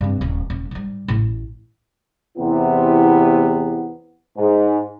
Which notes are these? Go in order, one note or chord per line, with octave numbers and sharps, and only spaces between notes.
G2 C4
D#1 E3
D#1
G#2 G3
A1 A2
E2 C3 B3 E4
G#2